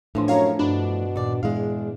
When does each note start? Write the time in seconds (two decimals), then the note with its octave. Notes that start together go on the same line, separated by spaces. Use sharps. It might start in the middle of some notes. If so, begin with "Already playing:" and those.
0.15 A2 E3 F3 D4 C6
0.28 F#2 C#5 F5 A#5
0.59 G2 B2 D4 B5
1.16 D#2 A#2 D5
1.43 E2 G#3 F5